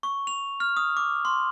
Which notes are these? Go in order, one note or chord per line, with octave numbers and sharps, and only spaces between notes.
C#6
F7
F6
D#6
D6
C6